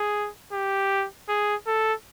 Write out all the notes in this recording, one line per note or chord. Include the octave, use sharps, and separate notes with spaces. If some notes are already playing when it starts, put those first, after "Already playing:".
Already playing: G#4
G4
G#4
A4